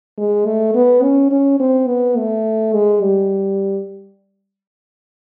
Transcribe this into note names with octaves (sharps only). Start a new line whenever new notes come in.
G#3
A3
B3
C#4
C#4
C4
B3
A3
G#3
G3